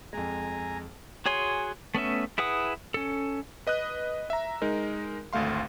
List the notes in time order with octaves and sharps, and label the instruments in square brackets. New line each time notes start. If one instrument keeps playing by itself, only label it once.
[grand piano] F2 G#3 [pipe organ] G#5 A#5
[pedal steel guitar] F#4 G#4 C#5 G#5 C6
A3 B3 C#4 E5
E4 G#4 B4 F#5 D#6
C#4 A4
[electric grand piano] B4 D#5 D#6 F#6
E5 A#5
G#3 D#4 A#4
G#1 D2 A3 F5 C6